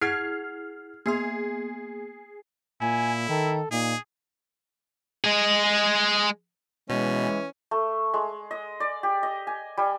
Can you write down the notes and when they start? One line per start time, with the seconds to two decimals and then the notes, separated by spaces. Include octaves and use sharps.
0.01 E4 G#4 F#5 F6 G#6 C7
1.06 A#3 B3 G#4 C6
2.81 A#2 E4 G#5
3.29 D#3 A4
3.71 A#2 D#4 G#4
5.24 G#3 G#4
6.90 B2 E3 G#3 C#4
7.71 A3
8.14 G#3
8.51 D#5
8.80 D5
9.03 G4
9.23 D#5
9.47 G#5
9.77 G3